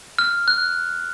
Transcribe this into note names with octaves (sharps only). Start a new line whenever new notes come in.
F6
F#6